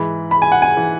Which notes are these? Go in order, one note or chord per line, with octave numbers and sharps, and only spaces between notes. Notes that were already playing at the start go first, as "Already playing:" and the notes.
Already playing: G#2 E3 B5
B5
G#5
F#5
G#5
E3